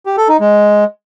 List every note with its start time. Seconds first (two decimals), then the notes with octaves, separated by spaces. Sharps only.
0.06 G4
0.17 A4
0.29 D#4
0.40 G#3